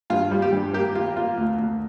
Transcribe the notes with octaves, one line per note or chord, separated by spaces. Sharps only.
G2 F4
G3
G4
G2
A#3 G4
A#3 F4
A#3 F4
D2
D2